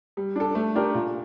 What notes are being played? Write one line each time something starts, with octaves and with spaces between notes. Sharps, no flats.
G3
D4 A4
A3
D4 G4 A#4
A#2